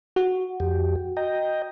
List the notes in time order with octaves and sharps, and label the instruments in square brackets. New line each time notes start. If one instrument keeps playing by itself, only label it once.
[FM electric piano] F#4
[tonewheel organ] F2 G4
D#5 G5 A#5